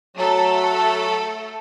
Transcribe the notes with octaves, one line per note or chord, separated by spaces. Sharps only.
F#3 A3 A4